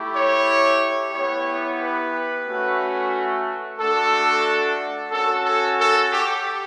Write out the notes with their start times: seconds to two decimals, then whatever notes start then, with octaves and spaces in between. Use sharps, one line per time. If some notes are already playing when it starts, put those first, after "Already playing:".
Already playing: A3 E4 G4
0.13 C#5
1.12 B3 E4 G4 C#5
1.79 B4
2.46 A3 C#4 F#4
3.78 A3 D4 F#4 A4
5.11 C#4 F#4 A4
5.44 A4
5.78 A4
6.11 G4